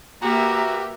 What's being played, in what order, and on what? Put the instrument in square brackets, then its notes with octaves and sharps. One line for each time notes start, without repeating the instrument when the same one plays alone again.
[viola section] A#3 B4 E5 [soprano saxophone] F#4 [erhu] G4 [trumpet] A#5